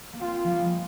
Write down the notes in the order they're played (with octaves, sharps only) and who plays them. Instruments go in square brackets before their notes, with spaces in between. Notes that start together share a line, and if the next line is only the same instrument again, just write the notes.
[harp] A#3
[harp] C4 [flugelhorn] F4
[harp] F3
G3
G#3
A#3